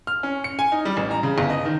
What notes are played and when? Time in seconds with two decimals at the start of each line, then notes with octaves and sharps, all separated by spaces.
0.07 F6
0.23 C#4
0.44 C#7
0.59 G#5
0.72 D#4
0.85 G3
0.97 A1
1.11 A#5
1.23 C#3
1.38 G1
1.50 D#5
1.65 D#3